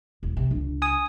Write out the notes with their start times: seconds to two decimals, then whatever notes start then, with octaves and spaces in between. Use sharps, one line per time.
0.23 E1
0.37 C3
0.50 C#2 D4
0.82 G#5 D#6